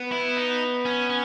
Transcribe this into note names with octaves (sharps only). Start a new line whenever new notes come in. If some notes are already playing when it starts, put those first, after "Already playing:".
Already playing: B3
E4
D#4
C#4
C#4